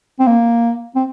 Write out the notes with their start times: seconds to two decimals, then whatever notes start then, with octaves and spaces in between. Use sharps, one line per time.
0.20 C4
0.27 A#3
0.96 C4